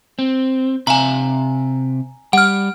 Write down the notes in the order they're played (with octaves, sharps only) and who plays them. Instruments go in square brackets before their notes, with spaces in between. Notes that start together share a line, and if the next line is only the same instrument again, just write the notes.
[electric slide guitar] C4
[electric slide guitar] C3 E5 F5 [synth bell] G#5 A#5
[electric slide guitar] G3 [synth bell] F#5 F6